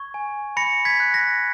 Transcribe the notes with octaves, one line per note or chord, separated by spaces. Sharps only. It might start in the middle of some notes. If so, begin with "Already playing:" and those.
Already playing: C#6 G#6
G#5
B5 A#6 C#7
G#6 B6
F#6
A#6